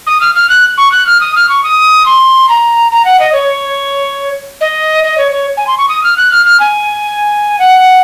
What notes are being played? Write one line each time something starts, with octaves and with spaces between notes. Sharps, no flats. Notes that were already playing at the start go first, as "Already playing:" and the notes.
D#6
F6
F6
F#6
C#6
F#6
F6
D#6
F6
C#6
D#6
C6
A#5
A#5
F#5
D#5
C#5
D#5
D#5
C#5
C#5
G#5
C6
C#6
D#6
F6
F#6
F6
F6
G#5
F#5